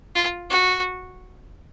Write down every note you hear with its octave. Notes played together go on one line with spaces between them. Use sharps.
F4
F#4